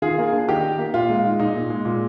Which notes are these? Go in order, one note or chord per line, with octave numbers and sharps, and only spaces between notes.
D#3 F4 G#4
A#3
D4
D#3 D#4 G4
D#3
A#3
A#2 F4
G#3
D#4
A#2 D#4
A#2
G#3
A#2